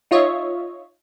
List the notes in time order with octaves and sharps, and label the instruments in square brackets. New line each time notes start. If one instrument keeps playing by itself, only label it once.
[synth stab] D#4 F4 C#5 D#5 E5